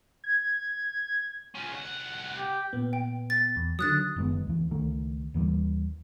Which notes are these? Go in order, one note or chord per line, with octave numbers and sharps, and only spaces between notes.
G#6
C#4 F4
C2 F#5
G4
A#2 B3
G5
A6
E2
D3 D#3 F#3 D#6 F#6 A6
F#1 D#3 G#3 B3
D2 E3
C#2 D#3 A3
D#2 E3 F#3 G3